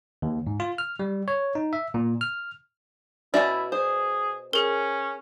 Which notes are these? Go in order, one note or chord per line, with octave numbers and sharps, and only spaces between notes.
D#2
G#2
F4
F6
G3
C#5
D#4
E5
A#2
F6
B2 C#4 E4 F#4 D5 E5
G#4 C5
C#4 G#4 A#4